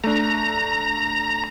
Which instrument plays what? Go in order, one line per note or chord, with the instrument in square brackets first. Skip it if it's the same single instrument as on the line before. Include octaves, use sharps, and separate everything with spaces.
[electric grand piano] A3 D4 [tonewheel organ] A#5